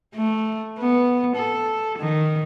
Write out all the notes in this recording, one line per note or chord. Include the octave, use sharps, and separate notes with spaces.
A3
B3
A4
D#3